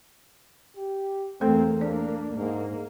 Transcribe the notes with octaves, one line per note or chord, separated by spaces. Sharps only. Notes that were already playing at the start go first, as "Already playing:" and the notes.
G4
E2 A3 A#3 C4 A4
A#3 D4 D5
G#2 A#3